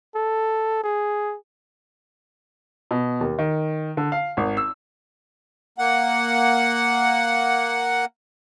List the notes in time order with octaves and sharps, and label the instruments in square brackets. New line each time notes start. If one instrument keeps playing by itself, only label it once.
[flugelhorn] A4
G#4
[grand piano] B2
D#2
D#3
D3
F5
G#1
E6
[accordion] A#3 F#5